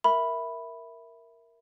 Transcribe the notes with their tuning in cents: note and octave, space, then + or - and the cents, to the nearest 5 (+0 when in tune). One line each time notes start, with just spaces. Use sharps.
A#4 +0 E5 +0 B5 +0